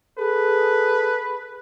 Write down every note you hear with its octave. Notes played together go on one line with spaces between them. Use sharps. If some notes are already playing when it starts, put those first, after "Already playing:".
G#4 A4 B4